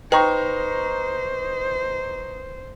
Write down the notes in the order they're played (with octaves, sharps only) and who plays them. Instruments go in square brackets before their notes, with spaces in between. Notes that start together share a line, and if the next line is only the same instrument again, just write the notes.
[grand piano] D#4 A#5 C#6 [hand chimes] B4 [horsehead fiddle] C5 [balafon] G5